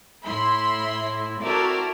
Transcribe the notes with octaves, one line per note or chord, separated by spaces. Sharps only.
A2 E4 B5 C6
C4 E4 F#4 A4 A#4 D5